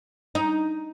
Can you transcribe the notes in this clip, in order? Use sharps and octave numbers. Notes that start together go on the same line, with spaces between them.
D#4